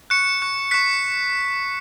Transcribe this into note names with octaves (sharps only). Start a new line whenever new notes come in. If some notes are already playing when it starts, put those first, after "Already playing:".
C#6 F#6 C#7
C#6 F#6
C#6 F#6 B6